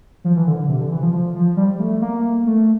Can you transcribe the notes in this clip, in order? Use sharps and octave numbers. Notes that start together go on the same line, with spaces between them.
F3
E3
D3
D3
C3
D3
E3
F3
F3
F3
G3
A3
A#3
A3